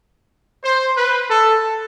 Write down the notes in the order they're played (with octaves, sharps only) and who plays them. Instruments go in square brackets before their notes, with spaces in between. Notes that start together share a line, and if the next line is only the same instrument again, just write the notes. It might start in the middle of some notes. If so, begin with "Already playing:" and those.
[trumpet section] C5
B4
A4